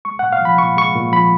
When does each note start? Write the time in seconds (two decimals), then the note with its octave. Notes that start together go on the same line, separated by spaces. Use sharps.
0.05 G#3 C#6
0.19 A#2 F#5
0.33 F5
0.41 F3 B5
0.58 A#2 C#6
0.77 G#3 C#6
0.95 A#2
1.13 F3 B5